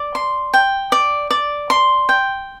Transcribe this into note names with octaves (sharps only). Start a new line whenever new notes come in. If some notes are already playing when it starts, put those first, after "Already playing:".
Already playing: D5
C6
G5
D5
D5
C6
G5